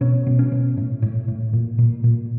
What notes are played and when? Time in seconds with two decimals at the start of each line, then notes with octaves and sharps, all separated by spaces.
0.01 B2 C#4
0.27 B2
0.39 C#4
0.52 B2
0.77 A2
1.02 A2
1.28 A2
1.53 A#2
1.78 A#2
2.04 A#2